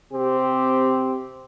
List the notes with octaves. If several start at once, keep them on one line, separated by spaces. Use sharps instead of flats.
C3 C4 G4